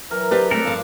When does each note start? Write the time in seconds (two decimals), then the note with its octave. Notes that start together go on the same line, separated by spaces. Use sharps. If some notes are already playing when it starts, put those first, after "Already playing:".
0.11 E3 F#3 A#4
0.31 D4 G4 B4 C5
0.51 G3 A3 C4 A4 A#4
0.65 G2 F3